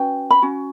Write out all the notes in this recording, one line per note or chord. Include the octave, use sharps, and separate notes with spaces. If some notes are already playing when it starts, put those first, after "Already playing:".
Already playing: C#4 F#4 B4 G5
B5
C#4 F#4